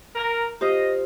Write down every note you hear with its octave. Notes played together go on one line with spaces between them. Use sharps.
A#4
F4 G4 C5 D#5